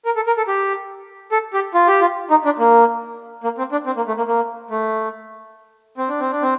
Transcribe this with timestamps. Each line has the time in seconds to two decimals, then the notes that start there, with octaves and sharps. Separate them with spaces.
0.05 A#4
0.16 A4
0.27 A#4
0.37 A4
0.48 G4
1.32 A4
1.53 G4
1.74 F4
1.87 G4
2.01 F4
2.31 D#4
2.45 D4
2.59 A#3
3.44 A#3
3.58 C4
3.72 D4
3.86 C4
3.97 A#3
4.08 A3
4.17 A#3
4.28 A#3
4.71 A3
5.98 C4
6.09 D4
6.20 C4
6.32 D4
6.42 C4